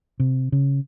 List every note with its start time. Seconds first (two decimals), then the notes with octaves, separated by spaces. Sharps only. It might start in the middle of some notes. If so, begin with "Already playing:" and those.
0.20 C3
0.52 C#3